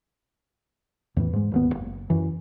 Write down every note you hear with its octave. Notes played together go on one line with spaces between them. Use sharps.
E2 A2 E3
G#2 G#3
D1 D#2 B3
F#1
F#2 E3